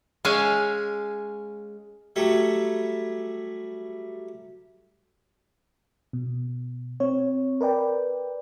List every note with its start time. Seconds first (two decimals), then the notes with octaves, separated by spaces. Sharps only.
0.25 G#3 C#4 E5 F5 G#5
2.16 F#3 G3 A3 A4 C#5
6.13 B2
7.00 C4 C#5
7.61 A#4 B4 D5 G5